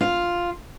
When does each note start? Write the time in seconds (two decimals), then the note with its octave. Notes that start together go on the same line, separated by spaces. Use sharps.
0.01 F4